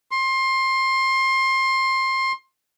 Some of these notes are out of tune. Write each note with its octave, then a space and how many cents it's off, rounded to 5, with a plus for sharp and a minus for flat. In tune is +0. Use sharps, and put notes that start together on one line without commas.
C6 +20